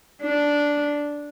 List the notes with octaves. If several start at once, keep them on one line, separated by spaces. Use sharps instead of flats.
D4